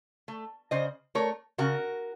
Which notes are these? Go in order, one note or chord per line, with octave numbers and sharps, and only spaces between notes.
A3
C#3 C5 D#5
A3 A#4 C#5
C#3 F#4 A#4